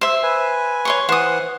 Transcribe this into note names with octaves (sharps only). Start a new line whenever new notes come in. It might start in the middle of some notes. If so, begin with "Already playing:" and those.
C5 E5
B4 G#5
C#5 C6 C#6
E3 C5 F#5 D#6